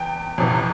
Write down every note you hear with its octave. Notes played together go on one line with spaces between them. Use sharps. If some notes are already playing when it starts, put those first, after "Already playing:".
Already playing: E2 G5 A5
G1 F2 C3 E3